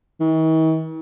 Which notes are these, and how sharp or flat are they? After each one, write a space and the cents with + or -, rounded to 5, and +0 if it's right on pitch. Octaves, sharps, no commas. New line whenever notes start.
D#3 +45